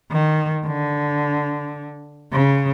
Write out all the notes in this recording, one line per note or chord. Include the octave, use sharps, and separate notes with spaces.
D#3
D3
C#3